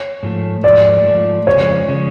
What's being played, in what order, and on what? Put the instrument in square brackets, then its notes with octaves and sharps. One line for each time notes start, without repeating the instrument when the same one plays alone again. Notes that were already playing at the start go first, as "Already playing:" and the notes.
Already playing: [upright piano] C#5
[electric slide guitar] G#2 F3 A3
[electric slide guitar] G#2 F3 A3 [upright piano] D5
[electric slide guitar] G#2 F3 A3
[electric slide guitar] F2 C#3 F3 G#3 C#4 [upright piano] C#5
[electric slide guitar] C#3 F3 G#3 C#4